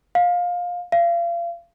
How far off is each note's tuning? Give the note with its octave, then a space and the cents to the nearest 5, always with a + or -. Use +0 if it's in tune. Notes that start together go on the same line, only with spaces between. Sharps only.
F5 +20
F5 -35